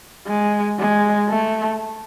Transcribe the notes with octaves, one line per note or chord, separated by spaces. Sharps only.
G#3
G#3
A3